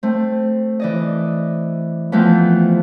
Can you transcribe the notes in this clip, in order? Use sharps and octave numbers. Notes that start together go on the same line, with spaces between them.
A3 C4
E3 D5 D#5
E3 F3 A3 B3 C4